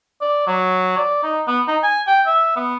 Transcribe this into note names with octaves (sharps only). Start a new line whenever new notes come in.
D5
F#3
D5
D#4
B3
D#4
G#5
G5
E5
B3